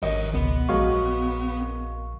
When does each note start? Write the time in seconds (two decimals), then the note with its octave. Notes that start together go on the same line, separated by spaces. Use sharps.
0.03 G#1 A#4 C#5 D#5
0.34 C#2 B2 B3
0.69 A#1 F#3 G#3 A#4 F5 C#6